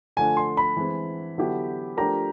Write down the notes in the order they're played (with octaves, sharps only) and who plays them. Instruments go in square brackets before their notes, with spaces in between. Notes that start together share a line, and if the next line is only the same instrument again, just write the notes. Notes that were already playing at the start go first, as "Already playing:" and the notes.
[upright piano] D3 F3 A3 D4 [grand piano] G#5
[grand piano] C6
B5
[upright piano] E3 G#3 C4
D3 F#3 B3 E4 G4
[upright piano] F3 A3 D4 G4 A#4 [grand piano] A#5